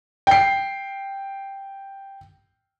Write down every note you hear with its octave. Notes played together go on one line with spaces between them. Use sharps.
G5 C7